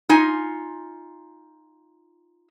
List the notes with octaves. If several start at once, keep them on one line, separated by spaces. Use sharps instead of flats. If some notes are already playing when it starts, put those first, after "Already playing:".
D#4 F4 G#5